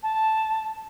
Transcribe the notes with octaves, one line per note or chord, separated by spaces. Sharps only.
A5